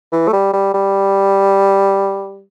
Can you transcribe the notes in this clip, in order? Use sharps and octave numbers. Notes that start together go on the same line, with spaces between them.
E3
A3
G3
G3
G3